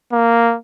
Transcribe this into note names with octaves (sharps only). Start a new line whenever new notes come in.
A#3